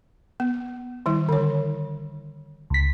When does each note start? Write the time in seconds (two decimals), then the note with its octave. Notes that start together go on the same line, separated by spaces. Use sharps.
0.40 B3
1.06 D#3 G3 E4
1.29 D3 C#5
2.70 C#2 B6